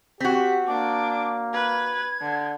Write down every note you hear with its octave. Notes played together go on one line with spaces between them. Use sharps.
C4 F#4 G4 B6
A#3 D4 D6
B4 G#6
D3